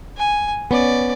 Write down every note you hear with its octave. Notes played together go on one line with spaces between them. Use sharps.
G#5
B3 C#4 D5